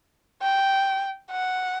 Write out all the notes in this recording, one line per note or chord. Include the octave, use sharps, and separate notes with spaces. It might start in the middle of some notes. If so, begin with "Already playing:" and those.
G5
F#5